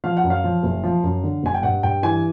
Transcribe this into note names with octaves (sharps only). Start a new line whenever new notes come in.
F3 F5
F#5
F#2
F5
F3
F#1
F3
F#2
D3
F#1 G#5
G5
G2 F#5
G2 G5
E3 G#5